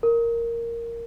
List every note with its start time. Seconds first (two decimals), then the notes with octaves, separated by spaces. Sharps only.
0.03 A#4